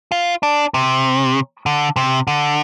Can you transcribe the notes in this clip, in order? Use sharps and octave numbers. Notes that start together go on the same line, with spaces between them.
F4
D4
C3
D3
C3
D3